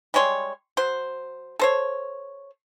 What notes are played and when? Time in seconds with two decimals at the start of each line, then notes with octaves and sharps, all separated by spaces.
0.14 G3 G#3 C#5 C6
0.77 F#3 C5
1.59 A4 C5 C#5